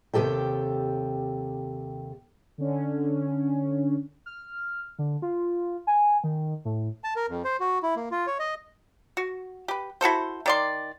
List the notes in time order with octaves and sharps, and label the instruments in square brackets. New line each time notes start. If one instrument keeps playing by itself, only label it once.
[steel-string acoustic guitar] D#2 C3 F3 G4 A4 G5
[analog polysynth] D3 C#4
[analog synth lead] F6
D3
F4
G#5
D#3
A2
[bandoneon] A5
A#4
F2
C5
F#4
E4
A#3
F4
C#5
D#5
[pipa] F#4
G4 B4
E4 F#4 A4 C5
D#3 D5 C6